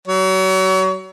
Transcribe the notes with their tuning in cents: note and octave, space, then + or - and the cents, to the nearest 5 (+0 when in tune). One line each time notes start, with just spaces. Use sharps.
F#3 +35 C#5 +35